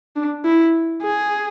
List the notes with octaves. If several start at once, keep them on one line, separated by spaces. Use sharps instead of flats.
D4
E4
G#4